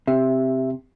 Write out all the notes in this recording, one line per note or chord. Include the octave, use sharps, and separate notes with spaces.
C3 G4 E5